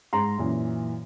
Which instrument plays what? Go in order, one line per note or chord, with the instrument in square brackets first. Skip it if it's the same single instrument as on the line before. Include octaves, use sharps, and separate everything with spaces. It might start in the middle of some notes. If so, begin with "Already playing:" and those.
[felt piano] G#2 A#5 C6
F#2 A#2 E3